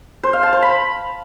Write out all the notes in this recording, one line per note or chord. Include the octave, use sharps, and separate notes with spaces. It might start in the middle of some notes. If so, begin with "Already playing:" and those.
C5
F5
A5
C5
B5